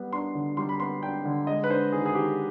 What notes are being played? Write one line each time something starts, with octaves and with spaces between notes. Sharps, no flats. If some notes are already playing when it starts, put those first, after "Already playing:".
Already playing: G3 B3
D4 C6
D3
G3 C6
B5
B3 C6
D4 G5
D3
G#3 D#5
B4
D4 C5
D#3 G#4
G#4
D#3 G4